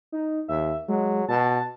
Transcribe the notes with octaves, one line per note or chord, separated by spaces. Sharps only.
D#4
D#2 E5
F#3 G#3
B2 A5